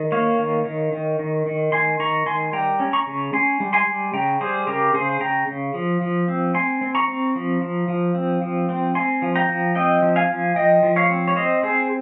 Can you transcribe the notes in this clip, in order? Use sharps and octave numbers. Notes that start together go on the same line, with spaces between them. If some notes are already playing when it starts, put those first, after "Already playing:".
Already playing: D#3
A#3 C#5 F5
D#3
D#3
D#3
D#3
D#3
D#3 G#5 C6
D#3 A#5 C#6
D#3 G#5 C6
G3 G5 A#5
C#4
A#5 C#6
C#3
C#4 G#5 C6
G3
G#5 C6
G3
C#3 G5 A#5
G3 G#4 C5
C#3 G4 A#4
C#3 G#4 C5
C#3 G5 A#5
C#3
F3
F3
C4
C4 G#5 C6
C4
A#5 C#6
C4
F3
F3
F3
C4
F3
C4
C4 G#5 C6
F3
G5 A#5
F3
C4 D#5 G5
F3
F5 G#5
F3
F3 D#5 G5
F3
C#5 F5
C4
C#5
C4 C5 D#5
C4 G#4 C5